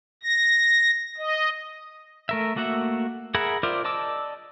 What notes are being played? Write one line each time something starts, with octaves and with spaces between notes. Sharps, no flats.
A#6
D#5
A3 A#4 E5
A3 A#3 F#4 E5 F#5
G#4 A#4 E5 F#5 B5
F4 A#4 C5 D5 E5
D5 D#5 A5 D6 E6